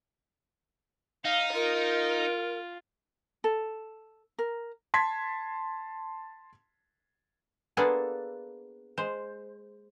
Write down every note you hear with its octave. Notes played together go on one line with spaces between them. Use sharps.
D#4 F5
F4 A#4
A4
A#4
A5 C6 G#6 B6
A#3 B3 D4 F4 G#4 A4
G#3 C5